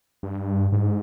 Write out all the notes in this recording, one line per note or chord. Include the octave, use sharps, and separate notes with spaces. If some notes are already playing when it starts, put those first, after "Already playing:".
G2
G#2